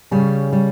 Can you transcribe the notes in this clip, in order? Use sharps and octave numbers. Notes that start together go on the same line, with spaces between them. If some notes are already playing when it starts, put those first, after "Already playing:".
C#3 G3 C#4
G3